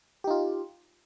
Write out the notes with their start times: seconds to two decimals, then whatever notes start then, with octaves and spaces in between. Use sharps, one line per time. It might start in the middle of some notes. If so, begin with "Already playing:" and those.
0.24 G4
0.27 D#4
0.31 F4